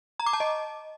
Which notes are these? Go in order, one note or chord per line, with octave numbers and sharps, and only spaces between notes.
A#5
D6
A5
D#5